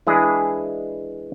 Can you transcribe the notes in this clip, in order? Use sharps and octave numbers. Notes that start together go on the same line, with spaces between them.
E3 G#3 D4 E4 G#4